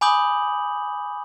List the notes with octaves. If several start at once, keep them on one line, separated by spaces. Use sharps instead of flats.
G#5 B5 D6 D#6 G6 F#7